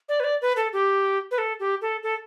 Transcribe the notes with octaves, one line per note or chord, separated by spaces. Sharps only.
D5
B4
D5
B4
A4
G4
B4
A4
G4
A4
A4